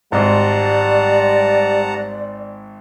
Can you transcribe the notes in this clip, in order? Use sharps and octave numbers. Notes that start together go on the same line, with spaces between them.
G#1 G#2 G3 D5 F#5 A5 A#5